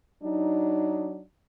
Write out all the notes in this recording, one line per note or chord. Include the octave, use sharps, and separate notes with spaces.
F#3 D4 D#4